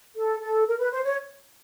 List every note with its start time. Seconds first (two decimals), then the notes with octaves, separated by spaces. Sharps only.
0.17 A4
0.41 A4
0.67 A#4
0.79 B4
0.92 C5
1.04 C#5